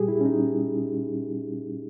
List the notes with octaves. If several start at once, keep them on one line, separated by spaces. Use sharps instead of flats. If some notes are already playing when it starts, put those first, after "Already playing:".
Already playing: A#2 G3 G4 G#4
E4
C#4
D#4